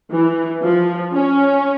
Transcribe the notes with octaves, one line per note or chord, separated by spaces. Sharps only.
E3
F3
C#4